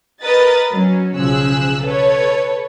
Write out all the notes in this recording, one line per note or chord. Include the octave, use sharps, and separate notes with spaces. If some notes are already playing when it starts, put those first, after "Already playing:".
A#4 B4 D#5 D#6 A6
F#3 C#4
B1 C#3 F3 G#4 E6 F#6
A4 B4 C#5